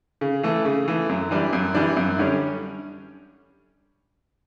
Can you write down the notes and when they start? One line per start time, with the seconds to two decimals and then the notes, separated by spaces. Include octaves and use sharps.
0.21 C#3
0.43 E3 A3
0.65 C#3
0.88 E3 A3
1.09 F#2
1.31 E3 G3 D4
1.53 F#2
1.74 E3 G3 D4
1.97 F#2
2.18 D3 G3 C#4